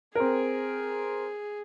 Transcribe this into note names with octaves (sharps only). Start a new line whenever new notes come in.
C4 G#4 A#4